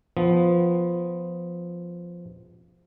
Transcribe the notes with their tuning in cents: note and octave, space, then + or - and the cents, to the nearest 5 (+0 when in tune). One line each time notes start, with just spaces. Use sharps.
F3 +0 B3 +10